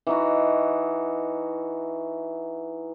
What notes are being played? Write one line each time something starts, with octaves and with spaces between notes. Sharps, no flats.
E3 D#4 F#4